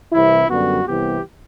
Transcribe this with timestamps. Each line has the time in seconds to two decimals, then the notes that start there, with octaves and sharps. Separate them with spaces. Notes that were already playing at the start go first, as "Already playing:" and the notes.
0.12 C2 C3 E3 E4
0.49 F#2 D3 G3 B3 F#4
0.87 C2 C3 E3 B3 G4